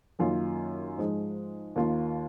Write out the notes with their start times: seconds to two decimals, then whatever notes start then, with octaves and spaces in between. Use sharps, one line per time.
0.19 F#2 D#3 A#3 C#4 F4
0.98 G#2 F3 G#3
1.76 D#2 D#3 A#3 F4 A#4